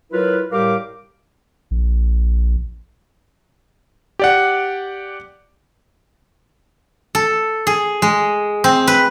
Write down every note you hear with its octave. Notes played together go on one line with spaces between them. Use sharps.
F#3 E4 F4 A#4 B4
A2 G3 G4 A#4 F5 D6
A#1
G4 D5 F#5
A4
G#4
G#3
C4
B4